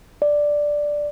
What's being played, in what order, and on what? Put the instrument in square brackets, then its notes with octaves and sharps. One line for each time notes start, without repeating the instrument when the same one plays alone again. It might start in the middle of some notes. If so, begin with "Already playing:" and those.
[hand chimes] D5